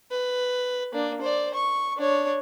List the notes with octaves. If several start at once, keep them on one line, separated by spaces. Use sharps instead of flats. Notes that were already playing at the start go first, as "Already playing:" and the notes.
B4
A#3 D4
C5 D5
C#6
D4 C#5